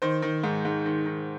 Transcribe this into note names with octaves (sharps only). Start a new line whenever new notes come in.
D#3 C5
D#3
G#2
G#2
D#3
D#3